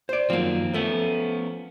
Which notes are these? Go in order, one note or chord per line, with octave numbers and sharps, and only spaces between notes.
C5 D5
F#2 D#3 F3 A#3 C4
F3 A3 B3 C#4